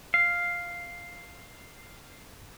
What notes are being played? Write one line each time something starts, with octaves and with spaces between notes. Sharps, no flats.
F5 C7